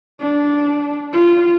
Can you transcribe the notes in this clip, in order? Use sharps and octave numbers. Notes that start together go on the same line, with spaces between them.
D4
F4